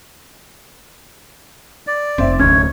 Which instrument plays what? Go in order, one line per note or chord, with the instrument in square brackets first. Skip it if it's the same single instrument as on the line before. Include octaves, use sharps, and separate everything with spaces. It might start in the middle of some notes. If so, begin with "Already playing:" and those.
[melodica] D5
[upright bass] F1 [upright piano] C4 E5
[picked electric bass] D1 D2 C#4 [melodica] C#5